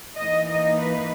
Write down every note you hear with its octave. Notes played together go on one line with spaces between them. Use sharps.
E3 A#3 D#4 D#5
D#5
B4